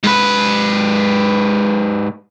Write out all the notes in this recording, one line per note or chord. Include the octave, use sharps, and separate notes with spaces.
G#2 B4